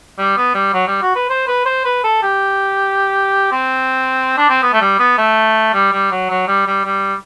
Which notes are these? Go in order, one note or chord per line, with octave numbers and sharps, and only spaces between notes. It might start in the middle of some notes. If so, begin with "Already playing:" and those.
G3
B3
G3
F#3
G3
F#4
B4
C5
B4
C5
B4
A4
G4
C4
D4
C4
B3
A3
G3
B3
A3
G3
G3
F#3
F#3
G3
G3
G3